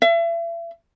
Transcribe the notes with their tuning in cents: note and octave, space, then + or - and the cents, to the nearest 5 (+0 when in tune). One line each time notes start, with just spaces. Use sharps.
E5 +35